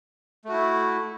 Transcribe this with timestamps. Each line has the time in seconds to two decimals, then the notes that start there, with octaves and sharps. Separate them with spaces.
0.45 A3
0.49 F#4
0.53 E4